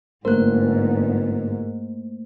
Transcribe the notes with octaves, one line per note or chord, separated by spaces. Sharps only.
G1 G#2 A3 A#3 A#4 C5 F#6